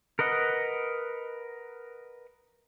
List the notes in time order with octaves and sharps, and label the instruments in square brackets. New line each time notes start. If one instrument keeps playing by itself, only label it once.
[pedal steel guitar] A#4 B4 D#5 F#5